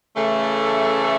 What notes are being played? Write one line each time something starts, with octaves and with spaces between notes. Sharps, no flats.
C#3 E3 A3